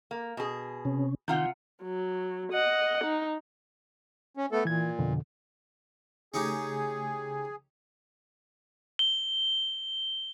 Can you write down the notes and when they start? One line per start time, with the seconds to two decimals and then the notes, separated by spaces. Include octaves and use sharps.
0.11 A#3
0.37 B2 G#4
0.85 C3 C#4
1.28 C3 D#3 F4 F#5 G6
1.83 F#3
2.52 D#5 F#5
3.04 D#4
4.37 C#4
4.52 A3 B3 A4
4.65 A#2 E3 G#6
4.99 F2 B2 D3
6.34 C#3 A3 C#4 D#4 G4 G#4
8.99 G7